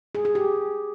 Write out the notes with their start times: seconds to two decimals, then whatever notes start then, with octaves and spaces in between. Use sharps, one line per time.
0.15 G#4
0.25 G#4
0.35 G4